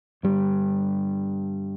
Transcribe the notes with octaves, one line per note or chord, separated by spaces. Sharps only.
G2 D3 G3